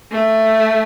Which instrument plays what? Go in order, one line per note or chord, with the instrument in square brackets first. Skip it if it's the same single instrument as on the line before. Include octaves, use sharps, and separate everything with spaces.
[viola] A3